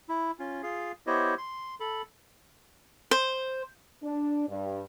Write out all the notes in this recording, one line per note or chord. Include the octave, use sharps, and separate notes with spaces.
E4
C#4 F4
F4 G#4 F5
B3 E4 G4 C5 C#5 D#5
C6
A4 B5
C5
D4
G2